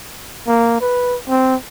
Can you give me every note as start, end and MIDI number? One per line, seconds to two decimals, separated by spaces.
0.47 0.80 58
0.81 1.17 71
1.28 1.55 60